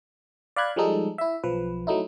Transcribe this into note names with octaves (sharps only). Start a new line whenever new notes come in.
D5 F5 B5 F#6 G#6
F3 G3 G#3 D#4 A4
E4 E5
B1 F3 B4
F#3 A3 D#4 E4